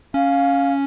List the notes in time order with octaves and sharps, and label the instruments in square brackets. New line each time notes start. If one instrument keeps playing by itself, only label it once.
[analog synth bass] C#4 [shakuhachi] F5